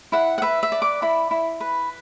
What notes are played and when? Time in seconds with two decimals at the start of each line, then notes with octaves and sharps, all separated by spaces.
0.12 E4 F#5
0.38 F#5
0.42 B4 E5
0.63 E5
0.72 D5
0.82 D6
1.02 E4 B5
1.31 E4
1.61 B4